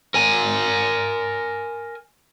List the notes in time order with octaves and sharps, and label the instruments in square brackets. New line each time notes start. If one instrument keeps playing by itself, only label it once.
[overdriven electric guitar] A#4 G#5